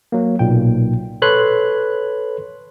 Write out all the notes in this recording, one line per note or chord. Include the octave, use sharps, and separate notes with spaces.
F#3 A#3
B1 A#2 G5
A4 B4 C#5 B5 C6 F#6